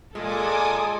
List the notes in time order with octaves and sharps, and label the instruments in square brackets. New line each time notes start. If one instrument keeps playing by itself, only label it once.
[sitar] A#2 [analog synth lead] G#3 [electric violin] A4 [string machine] G#5 D6 D#6